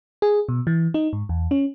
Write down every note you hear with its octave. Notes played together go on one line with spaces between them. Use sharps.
G#4
B2
E3
D#4
G#2
E2
C#4